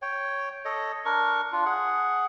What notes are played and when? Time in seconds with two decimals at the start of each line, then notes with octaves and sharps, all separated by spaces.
0.02 C#5 G5
0.65 A4 C#5 D#5
1.05 D4 A#4 C#6
1.52 D4 F4
1.65 G#4 F#5